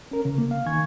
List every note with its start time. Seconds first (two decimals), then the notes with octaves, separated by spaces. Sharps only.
0.11 C#4 A#4
0.25 C#3
0.38 A#3
0.51 F5
0.66 D#3 G#5 C#6 G#6